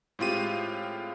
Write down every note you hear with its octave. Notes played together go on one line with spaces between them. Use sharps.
A2 G#3 C4 F4 G4 D#7